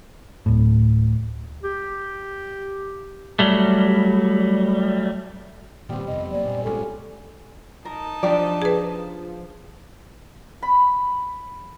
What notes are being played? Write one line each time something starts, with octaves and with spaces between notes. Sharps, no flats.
D1 A2
G4
F#3 G3 A3
G#1 A#2 D#3 G3 B3 C4
F2 C3 D#5
F#3 A#3 D5
G2 A#2 G#4
G#1 C#3 G3 G#3 C#4 F4 A4
D#4 A#4 A5
F3 D4 G4 D5
G#4 B4
B5